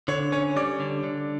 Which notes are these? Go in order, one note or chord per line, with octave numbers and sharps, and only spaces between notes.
D3 C#5
C#4 C#5
G3 D5
D3
D3